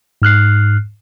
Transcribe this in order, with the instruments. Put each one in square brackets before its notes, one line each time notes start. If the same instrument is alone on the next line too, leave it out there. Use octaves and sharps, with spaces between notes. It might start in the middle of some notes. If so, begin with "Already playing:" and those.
[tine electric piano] G#2 F6 F#6 C7